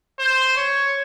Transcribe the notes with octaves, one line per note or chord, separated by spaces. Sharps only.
C5
C#5